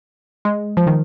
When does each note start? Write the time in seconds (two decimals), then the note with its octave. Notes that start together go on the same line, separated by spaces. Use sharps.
0.45 G#3
0.77 F3
0.87 D#3